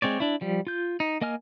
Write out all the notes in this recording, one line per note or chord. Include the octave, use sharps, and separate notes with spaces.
G#3 C4 C#5 D5
D4 E4
F3 G3
F4 G6
D#4
A#3 D#5 G#5 F6